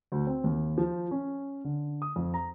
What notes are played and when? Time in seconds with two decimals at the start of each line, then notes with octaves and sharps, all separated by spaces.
0.12 D2
0.27 C4
0.44 D#2
0.78 F3
1.11 C#4
1.64 D3
2.02 D#6
2.16 F2
2.34 A#5